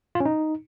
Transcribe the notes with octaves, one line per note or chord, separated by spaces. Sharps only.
F4
C#4
D#4